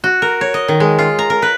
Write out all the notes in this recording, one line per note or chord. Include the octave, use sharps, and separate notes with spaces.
F#4
A#4
C#5
D#5
D#3
G#3
F4
A#5
A#4
B4